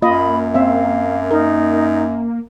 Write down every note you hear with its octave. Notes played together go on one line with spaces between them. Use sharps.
F#2 A#3 F4 D#5 B5
C4 E5 F5
D#4 A#4